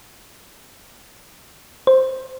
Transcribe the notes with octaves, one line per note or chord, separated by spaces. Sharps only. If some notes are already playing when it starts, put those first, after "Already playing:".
C5